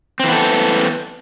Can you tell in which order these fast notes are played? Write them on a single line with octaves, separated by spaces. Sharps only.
C4 E3 B3 A4